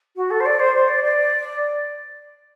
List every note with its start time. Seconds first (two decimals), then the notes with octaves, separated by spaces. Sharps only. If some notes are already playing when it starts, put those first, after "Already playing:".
0.16 F#4
0.30 A4
0.40 C5
0.45 D5
0.59 C5
0.75 C5
0.88 D5
1.04 D5